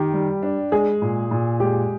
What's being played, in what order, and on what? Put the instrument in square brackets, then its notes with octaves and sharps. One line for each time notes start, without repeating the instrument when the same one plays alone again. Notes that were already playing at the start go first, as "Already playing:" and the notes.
Already playing: [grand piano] D#3 [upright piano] G4
[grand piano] G3
D4
[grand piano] G#3 [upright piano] G#4
[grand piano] A#2
A#2
[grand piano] G#3 [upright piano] G4